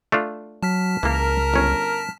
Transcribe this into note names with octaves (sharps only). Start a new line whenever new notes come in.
A3 D4 F4
F#3 A5 F6 B6
C#2 E3 A#3 A#4
G1 C#4